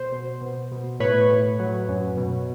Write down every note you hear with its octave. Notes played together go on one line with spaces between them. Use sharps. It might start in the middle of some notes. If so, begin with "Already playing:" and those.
Already playing: B2 C5
B2
B2
B2
A2 B4 C#5
A2
F#3
F#2
B2